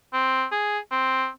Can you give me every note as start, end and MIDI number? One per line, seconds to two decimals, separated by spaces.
0.13 0.45 60
0.52 0.79 68
0.91 1.28 60